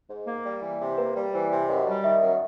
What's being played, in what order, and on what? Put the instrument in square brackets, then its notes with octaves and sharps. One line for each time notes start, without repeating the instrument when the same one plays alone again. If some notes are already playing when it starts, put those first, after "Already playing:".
[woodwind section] G#2
A#3
G3
E3
C3
[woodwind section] A#3 [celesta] B4
[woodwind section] G3
[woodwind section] E3 [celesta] C5
[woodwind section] C3
[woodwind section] F#2 [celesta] D#5
[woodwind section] G3
[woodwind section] D#3 [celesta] E5
[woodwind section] F#2